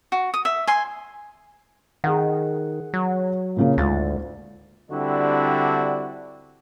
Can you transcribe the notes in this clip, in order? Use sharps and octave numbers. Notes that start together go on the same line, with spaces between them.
F#4
D#6
E5
G#5 C6
D#3 G#4 F#5
F#3
A#2 C#3 A#3
D2 G#2 F4 A6
D3 G3 C4 D4 E4 F#4